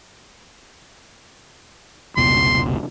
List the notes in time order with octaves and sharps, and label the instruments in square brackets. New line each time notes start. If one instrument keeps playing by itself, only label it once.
[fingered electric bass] F1 C#2 B2 [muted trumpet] C6